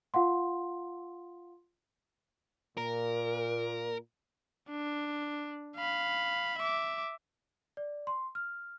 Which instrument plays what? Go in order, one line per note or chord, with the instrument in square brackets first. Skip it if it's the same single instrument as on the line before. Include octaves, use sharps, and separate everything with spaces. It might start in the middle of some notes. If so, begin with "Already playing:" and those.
[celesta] F4 F5 F#5 C6
[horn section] A#2 [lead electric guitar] A#4
[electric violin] D4
F5 B5
E5 D6
[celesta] D5
C6
F6